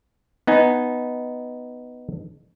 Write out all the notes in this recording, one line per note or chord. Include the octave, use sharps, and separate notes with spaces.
B3 D#4 G#5